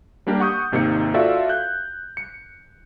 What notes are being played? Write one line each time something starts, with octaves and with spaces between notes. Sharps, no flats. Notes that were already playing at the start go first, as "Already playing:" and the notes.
G3 A#3 D4 G4 A#4
F#5 C#6 D#6 G6
G#1 C3 A#3 D#4 C#7
F4 F#4 A4 D5 E5 F5
F#6 G6
C#7